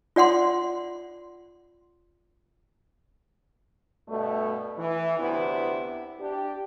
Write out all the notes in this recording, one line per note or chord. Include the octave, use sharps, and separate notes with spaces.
F4 D5 F#5 C6
G2 B2 A3
E3
D2 C3 B3 E4
D4 G4